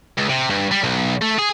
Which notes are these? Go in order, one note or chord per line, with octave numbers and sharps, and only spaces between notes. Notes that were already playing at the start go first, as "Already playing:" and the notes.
C#2
C3
G2
G3
B1
A3
G#4